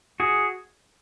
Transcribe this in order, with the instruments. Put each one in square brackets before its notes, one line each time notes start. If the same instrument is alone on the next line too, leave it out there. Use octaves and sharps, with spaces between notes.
[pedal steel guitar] F#4 G#4